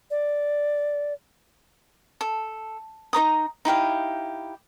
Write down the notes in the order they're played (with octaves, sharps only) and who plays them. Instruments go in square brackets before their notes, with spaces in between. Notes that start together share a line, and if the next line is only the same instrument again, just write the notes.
[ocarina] D5
[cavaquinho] A4
D#4 C#5 A#5 D#6
D#4 E4 G4 F5